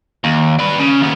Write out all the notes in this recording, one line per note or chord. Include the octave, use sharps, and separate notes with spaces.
D#2
D4 B4
C#3
D#2 B3